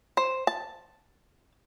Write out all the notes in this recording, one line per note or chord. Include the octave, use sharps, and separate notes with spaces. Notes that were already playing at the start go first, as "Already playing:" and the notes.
C5
A5